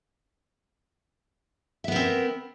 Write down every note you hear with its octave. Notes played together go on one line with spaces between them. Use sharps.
B3 C4 A#4 E5